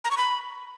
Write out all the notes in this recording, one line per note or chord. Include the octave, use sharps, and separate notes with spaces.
A#5
C#6
B5